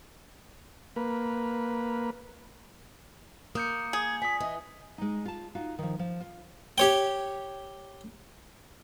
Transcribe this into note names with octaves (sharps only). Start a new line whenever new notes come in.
A#3 B4
A#3 D#6 G6 C#7
G#4 G#6
A#2 G#5 D#6 B6
E3 D#5
G#3 D#4
F4 A5
D#4 F4 F#4
D#3 F3
F3
F4
G4 C#5 G5